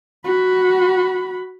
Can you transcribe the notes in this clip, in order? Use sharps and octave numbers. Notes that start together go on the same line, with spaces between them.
F#4 B5